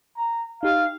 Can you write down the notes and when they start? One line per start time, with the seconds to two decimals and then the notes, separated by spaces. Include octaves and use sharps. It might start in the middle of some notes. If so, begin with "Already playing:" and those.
0.16 A#5
0.63 D#4 G4 F5